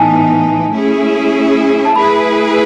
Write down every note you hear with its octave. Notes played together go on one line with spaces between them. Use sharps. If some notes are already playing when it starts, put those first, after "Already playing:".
Already playing: A2 E3 B3 D#4 G#5 A5
A3 C#4 E4 G#4
A5
A3 E4 G#4 B4 B5